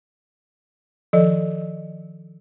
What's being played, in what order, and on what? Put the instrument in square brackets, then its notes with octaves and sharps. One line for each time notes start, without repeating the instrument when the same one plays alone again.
[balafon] D#3 F3 A4 D5 D#5